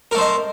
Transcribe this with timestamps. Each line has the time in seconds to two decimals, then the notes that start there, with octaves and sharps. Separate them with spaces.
0.11 A#4
0.15 A3
0.18 C5
0.21 D#5